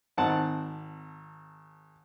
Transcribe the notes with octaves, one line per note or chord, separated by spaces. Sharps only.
G#1 C4 F#5 A5